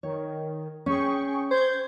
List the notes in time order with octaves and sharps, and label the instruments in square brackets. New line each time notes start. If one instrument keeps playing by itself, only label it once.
[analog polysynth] D#3 [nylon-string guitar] C#5
[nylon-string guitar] C#4 [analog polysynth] G#4 G5 C#6
[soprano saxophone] C5 [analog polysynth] G6 G#6